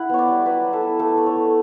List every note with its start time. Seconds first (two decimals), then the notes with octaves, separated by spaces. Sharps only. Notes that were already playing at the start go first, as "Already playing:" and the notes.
Already playing: E4 F#5
0.09 B3 C#5
0.19 D5
0.28 G3
0.46 F#3 B4
0.64 F#3
0.73 A4
0.81 E4
0.99 A3 A4
1.17 A3
1.26 C#5
1.36 A3